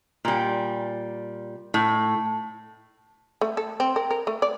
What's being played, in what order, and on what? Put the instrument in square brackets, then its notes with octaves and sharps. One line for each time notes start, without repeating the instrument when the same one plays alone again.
[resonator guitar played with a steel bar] A#2 G3
A2
[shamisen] A3
A4
C4
A#4
A#4
A3
D5